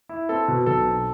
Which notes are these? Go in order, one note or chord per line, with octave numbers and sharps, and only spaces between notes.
E4
C4 A4
B2
B1 A4
C4